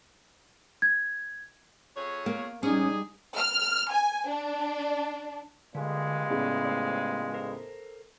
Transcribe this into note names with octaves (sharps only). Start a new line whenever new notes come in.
G#6
F2 G#4 C#5
A#3
G3 C#4 D#4 G#4
F6
G#5
D4
G2 A#2 D3 G#3
A2 C#3 B3 D5
A3 C5 D5
A4 A#4 C5